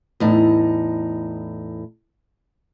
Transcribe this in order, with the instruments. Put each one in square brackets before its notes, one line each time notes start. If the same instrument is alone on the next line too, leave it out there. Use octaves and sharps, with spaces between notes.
[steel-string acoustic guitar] E2 A2 D#4